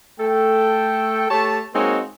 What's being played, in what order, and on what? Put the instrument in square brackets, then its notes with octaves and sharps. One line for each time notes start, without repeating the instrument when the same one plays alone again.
[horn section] A3 A4 G5
A3 G4 C#5 A5
G#3 A#3 C4 D#4 F#4 C#5